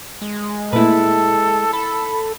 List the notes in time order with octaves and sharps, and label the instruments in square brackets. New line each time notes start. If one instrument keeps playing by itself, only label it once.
[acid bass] G#3
[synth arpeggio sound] A#2 A3 A#3 [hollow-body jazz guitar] E4 B4 [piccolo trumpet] A4
[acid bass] A4 [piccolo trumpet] B5